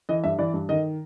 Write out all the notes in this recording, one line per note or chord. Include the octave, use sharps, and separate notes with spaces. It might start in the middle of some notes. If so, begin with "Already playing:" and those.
E3 D#5
G2 E5
E3 D5
G2
D#3 D#5